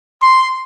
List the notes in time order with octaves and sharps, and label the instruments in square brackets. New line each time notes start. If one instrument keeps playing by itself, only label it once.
[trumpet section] C6